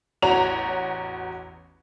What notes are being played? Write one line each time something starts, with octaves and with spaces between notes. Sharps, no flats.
A1 E2 F#4 C#5 A#5 F7